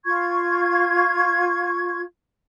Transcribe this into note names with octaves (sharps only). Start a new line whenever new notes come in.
F4 C#6 G#6